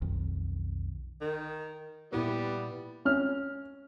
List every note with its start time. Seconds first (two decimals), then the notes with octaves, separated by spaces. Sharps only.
0.02 B1 F2 D#3
1.21 D#3
2.13 A#2 G3 B3 E4 B4
3.05 C#4 F6